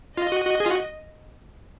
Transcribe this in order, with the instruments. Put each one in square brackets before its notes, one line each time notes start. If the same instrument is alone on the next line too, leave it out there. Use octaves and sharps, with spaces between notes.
[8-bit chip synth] F4 [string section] D#5
[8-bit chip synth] F#4
F#4
G#4
F4
F#4